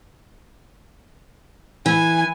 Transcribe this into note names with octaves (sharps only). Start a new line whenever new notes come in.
E3 G#5